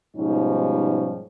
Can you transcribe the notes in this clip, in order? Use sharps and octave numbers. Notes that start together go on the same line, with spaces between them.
G#2 B2 F3 G3 C#4 D#4